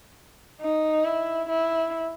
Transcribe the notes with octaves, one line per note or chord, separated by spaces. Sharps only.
D#4
E4
E4